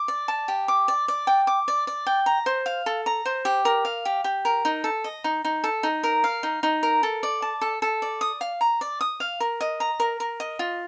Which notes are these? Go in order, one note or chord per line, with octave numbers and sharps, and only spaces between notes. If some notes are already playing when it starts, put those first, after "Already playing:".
Already playing: D6
D5
A5
G4
D6
D5
D5
G5
D6
D5
D5
G5
A#5
C5
F5
A4
A#5
C5
G4
A#4
F5
G4
G4
A#4
D#4
A4
D#5
D#4
D#4
A4
D#4
A#4
F5
D#4
D#4
A#4
A4
D5
A5
A4
A4
D5
D#6
F5
A#5
D5
D#6
F5
A#4
D#5
A#5
A#4
A#4
D#5
F4